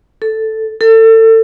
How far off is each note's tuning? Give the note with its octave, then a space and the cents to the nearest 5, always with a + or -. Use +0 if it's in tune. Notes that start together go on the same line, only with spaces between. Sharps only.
A4 +0
A4 +30